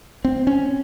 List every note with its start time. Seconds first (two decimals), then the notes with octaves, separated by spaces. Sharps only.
0.25 C4
0.47 C#4